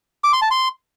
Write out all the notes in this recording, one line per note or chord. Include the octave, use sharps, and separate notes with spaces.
D6
C6
A5
C6